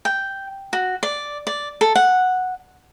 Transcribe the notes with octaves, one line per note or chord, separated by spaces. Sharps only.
G5
F#4
D5
D5
A4
F#5